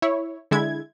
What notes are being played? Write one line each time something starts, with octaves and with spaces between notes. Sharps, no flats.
E4 C#5
D3 G#3 E4 G#6